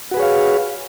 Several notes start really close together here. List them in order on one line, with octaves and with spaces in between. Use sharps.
F#4 B4 G#4 C#5 F5